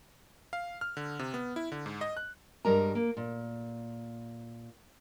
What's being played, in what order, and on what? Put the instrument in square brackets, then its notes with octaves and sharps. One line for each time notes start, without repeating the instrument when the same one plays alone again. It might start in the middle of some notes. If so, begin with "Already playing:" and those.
[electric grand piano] F5
F6
D3
C3
B3
E4
D3
G#2
D#5
F#6
[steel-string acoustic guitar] G2 G3 G#3 A#4 D5 A#5
A#3
A#2